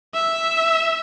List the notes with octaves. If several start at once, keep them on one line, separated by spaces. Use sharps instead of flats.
E5